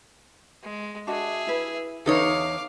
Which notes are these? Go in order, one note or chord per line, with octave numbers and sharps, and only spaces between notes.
G#3
D4 F#4 G#4 D#5 E5
E4 B4
E2 D#4 A4 B4 C#5 F5 D6